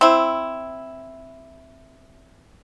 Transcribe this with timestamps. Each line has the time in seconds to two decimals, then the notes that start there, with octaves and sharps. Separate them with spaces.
0.01 C4 E4